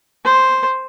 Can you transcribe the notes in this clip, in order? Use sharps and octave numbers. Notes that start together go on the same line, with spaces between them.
C5